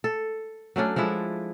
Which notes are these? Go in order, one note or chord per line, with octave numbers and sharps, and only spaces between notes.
A4
F#3 A3 C#4 D4
F3 G#3 D4 E4